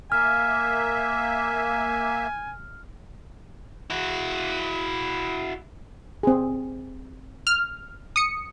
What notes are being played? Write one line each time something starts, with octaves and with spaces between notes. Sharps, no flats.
A#3 E5 G#5 F6
E4 F#4
C4 G#4
F6
D#6 C#7